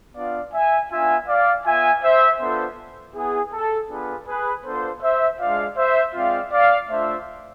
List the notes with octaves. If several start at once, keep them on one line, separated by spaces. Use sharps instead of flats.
B3 D4 F4 D5 F5
E5 G#5
B3 D4 F4 E5 G#5
D5 F5
B3 F4 E5 G#5
C5 E5
B3 D4 F4 A4 C5
B3 E4 G#4
A4
B3 D4 F4 G#4 B4
G#4 B4
B3 D4 F4 A4 C5
C5 E5
G#3 D4 F4 D5 F5
C5 E5
G#3 C4 F4 D5 F5
D5 F5
A3 D4 F4 C5 E5